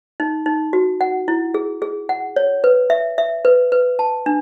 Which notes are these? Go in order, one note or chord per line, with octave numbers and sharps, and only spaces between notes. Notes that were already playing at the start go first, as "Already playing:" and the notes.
D#4
D#4
F#4
F#5
E4
G#4
G#4
F#5
C#5
B4
E5
E5
B4
B4
A5
D4